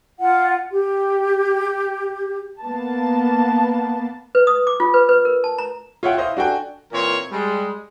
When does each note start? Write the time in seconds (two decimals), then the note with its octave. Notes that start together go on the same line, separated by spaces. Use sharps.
0.19 F4 F#5
0.71 G4
2.61 A#3 B3 A5
4.35 B4
4.47 D#6
4.67 D6
4.80 F4
4.94 B4
5.09 B4
5.25 A#4
5.44 A5
5.58 A#5
6.03 F4 C#5 E5 F#5 G5
6.17 E4 C5 D#5 F5
6.37 D4 F#4 A4 G5 G#5
6.92 A#2 E3 C4 A#4 C#5
7.32 G3 G#3